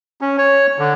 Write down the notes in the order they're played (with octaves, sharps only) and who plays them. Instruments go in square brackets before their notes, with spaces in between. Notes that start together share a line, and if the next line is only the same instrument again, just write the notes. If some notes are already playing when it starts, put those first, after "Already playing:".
[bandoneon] C#4
C#5
D3